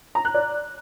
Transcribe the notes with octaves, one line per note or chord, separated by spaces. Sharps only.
A#5
F#6
D5